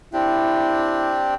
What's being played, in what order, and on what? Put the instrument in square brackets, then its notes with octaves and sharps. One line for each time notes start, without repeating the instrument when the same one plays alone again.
[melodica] C4 D4 G4 [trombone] E4